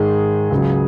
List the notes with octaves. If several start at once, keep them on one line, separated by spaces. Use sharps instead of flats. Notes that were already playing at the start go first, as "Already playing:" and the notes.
Already playing: G#2 D#3 G#3 G#4
C#2 C#3 F#3